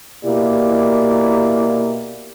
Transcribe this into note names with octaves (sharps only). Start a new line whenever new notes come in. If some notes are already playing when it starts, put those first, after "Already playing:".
B2 A#3 E4 G4 D5